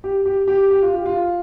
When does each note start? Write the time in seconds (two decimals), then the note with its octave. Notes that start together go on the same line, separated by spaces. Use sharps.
0.04 G4
0.26 G4
0.48 G4
0.71 G4
0.82 F4
0.94 G4
1.06 F4